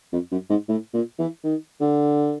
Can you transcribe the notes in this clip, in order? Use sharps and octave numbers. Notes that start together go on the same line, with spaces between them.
F2
F#2
G#2
A2
A#2
E3
D#3
D3